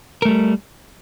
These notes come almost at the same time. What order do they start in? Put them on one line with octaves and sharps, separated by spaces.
A#4 A3 G3